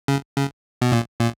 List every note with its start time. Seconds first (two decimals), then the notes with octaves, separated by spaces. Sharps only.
0.08 C#3
0.37 C#3
0.82 B2
0.92 A#2
1.20 A#2